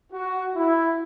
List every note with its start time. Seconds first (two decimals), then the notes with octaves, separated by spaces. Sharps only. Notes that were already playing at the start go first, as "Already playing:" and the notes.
0.11 F#4
0.54 E4